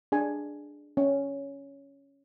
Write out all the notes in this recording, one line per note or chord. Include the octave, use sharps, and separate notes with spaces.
D4 G#4 G#5
C#4